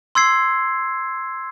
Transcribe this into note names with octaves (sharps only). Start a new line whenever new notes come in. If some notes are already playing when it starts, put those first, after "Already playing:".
C6 E6 G#6 C7